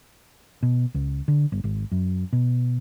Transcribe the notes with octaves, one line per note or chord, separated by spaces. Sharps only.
B2
C#2
D3
G1
G#1
F#2
B2